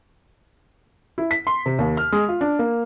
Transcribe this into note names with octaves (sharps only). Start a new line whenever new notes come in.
E4
B6
C6
C3
D#2
F6
G#3
F4
D4
A#3